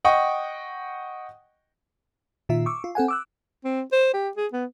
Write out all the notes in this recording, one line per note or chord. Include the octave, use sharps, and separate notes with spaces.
D#5 F#5 G5 C#6
A#2 D#3 F4 E5
C#6 D6 E6
F4
C4 A4 F#5 G#5
D6 E6 F#6
C4
C5
G4
G#4
B3